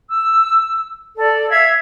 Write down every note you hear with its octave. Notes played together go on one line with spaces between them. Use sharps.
E6
A4 D5
E5 F5 E6 G#6